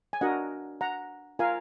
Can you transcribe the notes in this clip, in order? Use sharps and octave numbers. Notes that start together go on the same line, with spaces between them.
G#5
D4 F#4 A#4 D#5 F#5
F#5 A#5
F4 A#4 F5 G#5